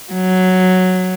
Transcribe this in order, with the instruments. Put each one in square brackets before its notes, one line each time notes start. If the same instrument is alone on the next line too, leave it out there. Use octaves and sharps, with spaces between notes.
[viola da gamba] F#3